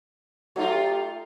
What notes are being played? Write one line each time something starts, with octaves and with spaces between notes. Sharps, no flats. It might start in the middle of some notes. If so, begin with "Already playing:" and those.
F#3 A3 D#4 F4
G4